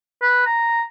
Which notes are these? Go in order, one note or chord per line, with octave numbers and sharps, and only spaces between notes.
B4
A#5